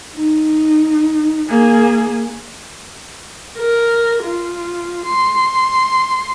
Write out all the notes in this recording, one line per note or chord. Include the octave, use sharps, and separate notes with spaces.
D#4
A#3 G#4
A#4
F4
C6